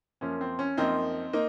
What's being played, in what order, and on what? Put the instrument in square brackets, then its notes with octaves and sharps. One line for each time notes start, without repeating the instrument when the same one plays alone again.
[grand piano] F#2 F3 A#3 C#4
C4
C#4
F#2 F3 A#3 C4 D#4
A#3 D#4